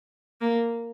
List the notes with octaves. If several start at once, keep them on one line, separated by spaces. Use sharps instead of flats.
A#3